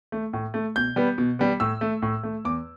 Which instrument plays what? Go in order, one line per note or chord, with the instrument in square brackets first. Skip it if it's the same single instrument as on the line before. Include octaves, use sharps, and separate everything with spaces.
[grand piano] A3
A2
A3
B2 G6
G3 B3
B2
G3 B3
A2 E6
A3
A2
A3
E2 D6